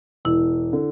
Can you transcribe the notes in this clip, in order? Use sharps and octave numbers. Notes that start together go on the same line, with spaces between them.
E1 E4
D3